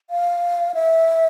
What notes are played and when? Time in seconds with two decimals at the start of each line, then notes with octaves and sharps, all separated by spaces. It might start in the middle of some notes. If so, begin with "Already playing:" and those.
0.10 F5
0.74 E5